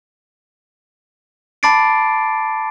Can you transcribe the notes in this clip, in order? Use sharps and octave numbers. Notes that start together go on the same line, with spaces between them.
A5 B5 D6 A6 C7 D7